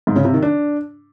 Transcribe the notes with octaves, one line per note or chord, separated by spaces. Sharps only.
G#2
C#3
C3
D#3
D4